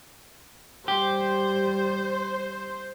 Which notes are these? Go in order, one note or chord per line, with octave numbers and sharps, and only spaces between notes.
G3 G4 C5